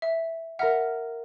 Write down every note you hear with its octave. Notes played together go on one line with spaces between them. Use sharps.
E5
A#4 E5 F#5 A#5 F6